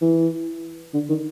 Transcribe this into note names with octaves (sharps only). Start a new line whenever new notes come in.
E3
D3
D#3